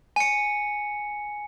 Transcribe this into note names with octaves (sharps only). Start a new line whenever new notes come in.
G#5 C#7